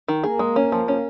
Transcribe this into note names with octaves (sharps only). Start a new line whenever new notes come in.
D#3
A#3 G#4
G#3
C#4
F3
C#4